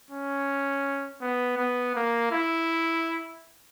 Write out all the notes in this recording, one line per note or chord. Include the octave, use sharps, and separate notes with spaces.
C#4
B3
B3
A#3
E4